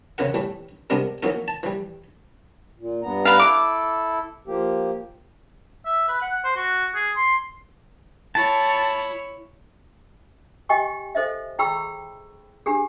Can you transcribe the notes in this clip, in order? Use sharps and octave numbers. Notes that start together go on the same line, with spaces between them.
E2 C#3 E3 A#4 F#5
A2 E3 G3 A3
C3 G3 G#3 B3 D4 A#4
E3 F#3 A#3 B3 D#4 A#4
A5
E3 G3
A#2
G2 B3 A#5
B4 F5
E4 A4 D6
F3 A#3 G4
E5
B4
F#5
C5
F#4
G#4
C6
E4 C#5 A5
G4 D#5 G5 G#5 C#6
A4 C5 D#5 E5
E4 G#4 G5 B5 C#6 E6
D4 G4 G#4